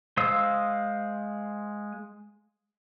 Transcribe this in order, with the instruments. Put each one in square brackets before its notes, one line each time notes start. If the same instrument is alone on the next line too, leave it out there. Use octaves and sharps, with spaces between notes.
[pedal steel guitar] G#3 C5 F5 D#6 E6